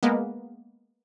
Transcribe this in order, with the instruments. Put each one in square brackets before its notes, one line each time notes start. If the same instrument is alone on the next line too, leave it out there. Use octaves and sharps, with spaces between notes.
[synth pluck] G#3 A#3 B3